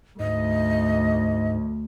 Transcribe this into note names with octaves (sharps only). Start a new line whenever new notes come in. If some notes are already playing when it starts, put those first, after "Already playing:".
D2 G#2 D#5